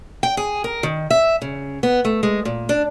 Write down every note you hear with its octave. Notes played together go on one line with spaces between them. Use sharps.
G5
G#4
A#4
D#3
E5
C#3
B3
A3
G#3
A#2
D4